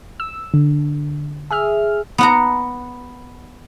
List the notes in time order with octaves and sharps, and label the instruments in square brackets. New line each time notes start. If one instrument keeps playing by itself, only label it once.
[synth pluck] E6
D3
G#4 E5 F6
[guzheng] B3 F#5 A#5